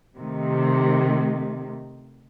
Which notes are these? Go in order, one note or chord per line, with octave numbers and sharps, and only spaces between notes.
C3 D#3 A3